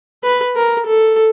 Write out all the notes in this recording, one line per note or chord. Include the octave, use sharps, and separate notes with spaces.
B4
A#4
A4